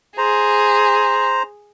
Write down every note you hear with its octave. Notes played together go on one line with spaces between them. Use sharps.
G#4 C5 A#5